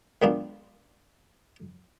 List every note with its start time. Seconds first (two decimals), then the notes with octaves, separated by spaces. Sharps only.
0.22 D#3 G#3 B3 D4 F4